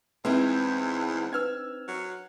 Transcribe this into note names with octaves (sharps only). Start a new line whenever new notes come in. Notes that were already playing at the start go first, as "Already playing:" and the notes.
E2 G#3 C4 D#4 E4 B4
D4 B4 E6 F6 G#6
F#3